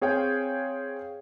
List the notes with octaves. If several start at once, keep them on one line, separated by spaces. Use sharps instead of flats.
C4 G#4 C#5 F5 G5